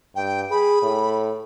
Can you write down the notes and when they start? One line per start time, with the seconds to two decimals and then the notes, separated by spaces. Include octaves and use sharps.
0.16 G2 G5
0.51 G#4 B5
0.82 A2